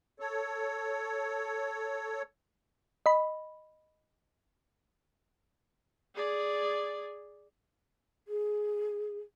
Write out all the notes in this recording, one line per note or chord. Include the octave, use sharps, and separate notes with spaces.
A4 C#5
D#5 B5
G#4 D5
G#4